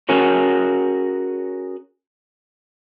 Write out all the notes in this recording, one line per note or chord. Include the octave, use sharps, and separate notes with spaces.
C#4 F#4 G#4 A#4 C#5